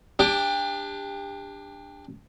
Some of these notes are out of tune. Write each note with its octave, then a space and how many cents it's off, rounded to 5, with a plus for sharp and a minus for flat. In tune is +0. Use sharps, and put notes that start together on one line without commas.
D4 +0 G4 +30